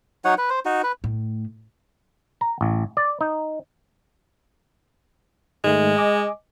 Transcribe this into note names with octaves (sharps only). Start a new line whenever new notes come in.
F#3 D#4 C#5 F#5
B4
C5
D#4 F#4
B4
A2
A#5
A1
D5
D#4
G#2 D#3 G#3 A3
D#5 G#5 D6